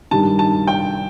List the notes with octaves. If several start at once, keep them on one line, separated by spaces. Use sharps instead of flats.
G2 D#3 G3 A5
A5
G5